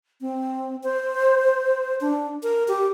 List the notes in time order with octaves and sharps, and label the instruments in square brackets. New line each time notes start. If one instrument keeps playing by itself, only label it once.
[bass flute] C4
C5
D4
A#4
G4